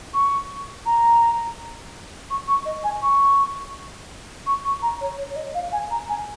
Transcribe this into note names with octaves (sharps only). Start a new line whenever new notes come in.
C#6
A#5
C#6
C#6
D#5
G#5
C#6
C#6
C#6
A#5
C#5
C#5
C#5
D#5
F5
G#5
A#5
G#5